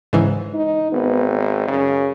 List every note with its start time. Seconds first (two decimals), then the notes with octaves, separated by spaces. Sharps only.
0.13 G#2 C#3 E3
0.54 D#4
0.92 G#1 B3
1.33 D5
1.68 F#2 C#3